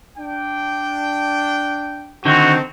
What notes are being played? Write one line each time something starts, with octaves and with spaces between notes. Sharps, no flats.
D4 G5
D3 D#3 C4 D#4 F#4